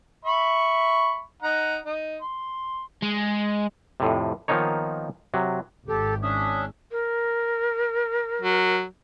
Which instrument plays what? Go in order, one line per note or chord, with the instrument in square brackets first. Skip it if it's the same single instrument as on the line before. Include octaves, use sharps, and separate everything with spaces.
[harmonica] E5 B5 C#6
D#4 F#5 A#5
D#4
C6
[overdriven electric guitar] G#3
[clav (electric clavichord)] F2 A2 C3
D#3 F3 A#3 B3 D#4 C#5
C3 F#3
[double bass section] G#1 [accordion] G4 [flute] A4
[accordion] C#4 D4 E5 [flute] D#6
[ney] A#4
[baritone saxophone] F#3